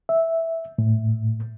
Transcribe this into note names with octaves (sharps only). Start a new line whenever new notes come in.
E5
A2